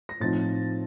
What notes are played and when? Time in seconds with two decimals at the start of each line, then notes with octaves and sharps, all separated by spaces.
0.09 A#6
0.20 A2 F3 C4 D#4 A6